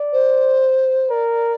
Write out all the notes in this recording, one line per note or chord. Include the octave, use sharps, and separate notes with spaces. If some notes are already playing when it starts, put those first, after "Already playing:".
Already playing: D5
C5
A#4 D5